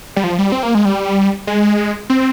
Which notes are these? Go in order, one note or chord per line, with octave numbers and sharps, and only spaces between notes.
G3
F3
G3
C4
A#3
G#3
G3
G#3
C4